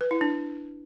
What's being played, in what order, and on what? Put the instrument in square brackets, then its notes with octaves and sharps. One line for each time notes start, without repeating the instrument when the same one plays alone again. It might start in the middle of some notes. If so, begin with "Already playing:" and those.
[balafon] B4
E4
D4